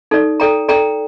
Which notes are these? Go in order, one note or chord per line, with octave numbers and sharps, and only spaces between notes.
D#4 A4 D5
A4 D5 G5 A#5
A4 D5 G5 A#5